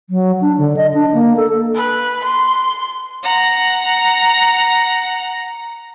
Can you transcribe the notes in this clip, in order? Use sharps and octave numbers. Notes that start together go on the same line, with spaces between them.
F#3
D4
D3
D#5
D4
A#3
A4
B4
C6
F#5 A#5